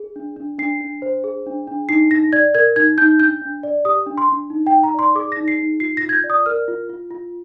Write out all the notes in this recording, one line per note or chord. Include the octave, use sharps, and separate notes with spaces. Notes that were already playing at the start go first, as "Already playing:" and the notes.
Already playing: G#4
D4
D4
D4 C7
D4
C5
G#4
D4
D4
D#4 C7
D#4 A#6
D5 G#6
A#4 G#6
D#4 G#6
D#4 G6
D4 G6
D4
D5
G4 D#6
D4
C6
D4
D#4
G5
D#4
A#5
D5 C6
G#4 D6
A#6
D#4
C7
D#4
F4 C7
A#6
F4
G#6
G6
D5
D#6
A#4 F6
F4
F4
F4